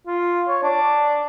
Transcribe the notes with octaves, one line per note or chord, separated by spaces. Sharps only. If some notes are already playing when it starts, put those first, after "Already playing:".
F4
C#5
D4